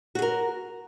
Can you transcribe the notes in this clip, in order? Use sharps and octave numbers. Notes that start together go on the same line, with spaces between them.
F#4 G#4 A#4